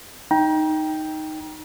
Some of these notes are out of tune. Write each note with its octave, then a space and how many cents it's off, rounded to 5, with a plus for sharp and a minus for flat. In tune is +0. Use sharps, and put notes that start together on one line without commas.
D#4 +0 G5 +0 A#5 +35